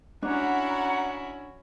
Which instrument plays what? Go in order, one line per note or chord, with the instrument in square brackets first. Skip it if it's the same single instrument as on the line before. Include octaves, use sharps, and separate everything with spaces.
[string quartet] C#4 E4 F#4 [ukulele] D4 [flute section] F#5 A#5